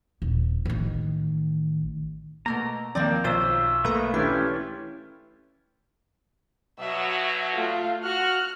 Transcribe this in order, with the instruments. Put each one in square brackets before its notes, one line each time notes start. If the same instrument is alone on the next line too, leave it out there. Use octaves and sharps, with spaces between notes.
[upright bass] D#1
A1 D#3
[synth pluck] B2 A3 A#3 [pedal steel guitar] A#5
[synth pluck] D#3 F3 C4 [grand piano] A#3 D5 [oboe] G5
[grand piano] B1 [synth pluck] F4 C5 [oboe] E5
[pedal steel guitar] A3 A#3 B4 [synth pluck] A#5 D#6
[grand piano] E3 A3 E4 [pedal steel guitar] C#4 G4 [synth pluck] D4 [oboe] F4
[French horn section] B2 F#3 [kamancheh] E5
[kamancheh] A3 F4
[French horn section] F#4 [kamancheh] F6 F#6